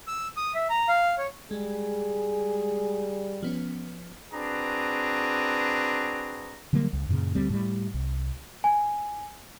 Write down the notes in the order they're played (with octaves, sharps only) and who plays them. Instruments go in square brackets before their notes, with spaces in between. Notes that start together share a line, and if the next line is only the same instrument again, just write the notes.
[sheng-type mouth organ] E6
D#6
E5
A#5
F5
C#5
[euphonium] G3 [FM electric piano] G#3 [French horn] G#4
[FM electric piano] F3 B3 C#4
[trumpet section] C4 D4 F#4 G#4 B4 A#5
[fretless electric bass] D3 F#3 G3 A#3
C#2
F#2 A#2 C#3
D2 G3 C4
A2 G3
C2
[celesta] G#5